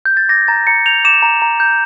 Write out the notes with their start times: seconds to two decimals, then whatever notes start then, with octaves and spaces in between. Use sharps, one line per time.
0.05 G6
0.17 A6
0.29 D6 A#6
0.48 A#5 A6
0.67 A#5 C#7
0.86 G6 F7
1.05 D6 E7
1.22 A#5
1.42 A#5
1.60 G6